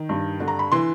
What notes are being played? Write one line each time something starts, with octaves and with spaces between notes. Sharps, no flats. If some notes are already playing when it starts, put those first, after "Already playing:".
Already playing: D#3
G2
D3
A#5
B5
E3 C6